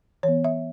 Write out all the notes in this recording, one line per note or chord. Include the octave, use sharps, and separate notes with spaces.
E3 B3 C#5
E5